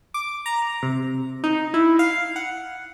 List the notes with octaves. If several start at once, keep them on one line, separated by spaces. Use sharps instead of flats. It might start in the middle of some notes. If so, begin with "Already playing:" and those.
D6
A#5
C3
D#4
E4
F5
F#5